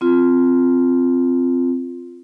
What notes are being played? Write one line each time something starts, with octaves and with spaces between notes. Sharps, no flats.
C4 F4